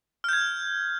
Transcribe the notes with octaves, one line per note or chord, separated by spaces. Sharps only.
F6 G6 G#6